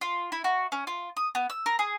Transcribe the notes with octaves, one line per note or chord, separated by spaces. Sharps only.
F4
E4
F#4
C#4
F4
D#6
B3
E6
A#4
G#4